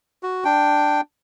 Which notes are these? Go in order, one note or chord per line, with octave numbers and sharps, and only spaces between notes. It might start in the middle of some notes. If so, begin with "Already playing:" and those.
F#4
D4 G5